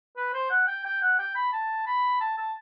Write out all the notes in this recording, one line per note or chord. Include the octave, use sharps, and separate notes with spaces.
B4
C5
F#5
G5
G5
F#5
G5
B5
A5
B5
A5
A5